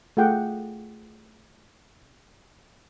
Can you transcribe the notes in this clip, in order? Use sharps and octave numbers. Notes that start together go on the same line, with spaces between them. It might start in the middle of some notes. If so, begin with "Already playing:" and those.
A3 F4 G#4 F#5 G5